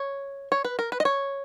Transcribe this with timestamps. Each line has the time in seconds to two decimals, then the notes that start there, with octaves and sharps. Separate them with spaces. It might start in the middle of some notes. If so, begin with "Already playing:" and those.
Already playing: C#5
0.52 C#5
0.65 B4
0.79 A#4
0.92 B4
1.00 D#5
1.05 C#5